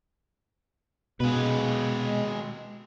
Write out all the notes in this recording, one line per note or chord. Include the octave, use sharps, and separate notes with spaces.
B2 G#3 B4